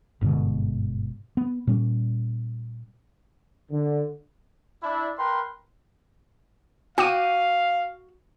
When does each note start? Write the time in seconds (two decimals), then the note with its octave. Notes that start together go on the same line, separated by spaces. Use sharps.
0.21 G1 G#2 B2 D3
1.37 B3
1.67 A#2 G3 C#4
3.71 D3
4.82 D4 E4
5.18 A#4 B4 G5 C6
6.98 F#4 F5 G5 D6 D#7